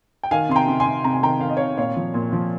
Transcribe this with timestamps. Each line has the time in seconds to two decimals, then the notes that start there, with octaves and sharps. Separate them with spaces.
0.23 G5
0.31 D#3 F5 G#5
0.49 C3 C6
0.56 G5 A#5
0.68 C3
0.80 G#5 C6
0.86 C3
1.04 C3 A#5
1.14 G#5
1.23 D#3 G5 A#5
1.41 D#3 F5
1.50 D#5
1.57 C3 C#5 F5
1.77 A#2 C#5 F5
1.96 F3
2.14 A#2
2.33 F3